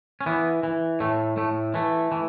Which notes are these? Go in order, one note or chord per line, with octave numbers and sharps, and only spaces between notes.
C#4
E3 B3
E3
A2 A3
A2 A3
E3 A3
E3